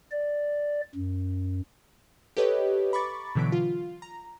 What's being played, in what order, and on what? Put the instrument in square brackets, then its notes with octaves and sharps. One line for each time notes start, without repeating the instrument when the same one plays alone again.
[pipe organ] D5
F#2
[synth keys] G4 A4 B4 C#5 D#5
A#5 B5 C#6 D6 A6
B2 D3 E3 F#3 B6 D7
F4
A#5